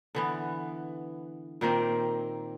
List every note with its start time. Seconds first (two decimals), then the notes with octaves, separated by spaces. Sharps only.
0.15 D3 E3 B3
1.61 A#2 D#3 A#3 C4